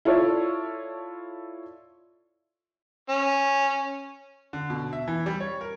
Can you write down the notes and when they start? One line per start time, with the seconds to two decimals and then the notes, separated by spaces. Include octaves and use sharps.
0.05 E4 F4 A4 C#5 D5
3.09 C#4
4.53 D3
4.70 B2
4.93 E5
5.08 E3
5.26 G3
5.40 C#5
5.61 A#4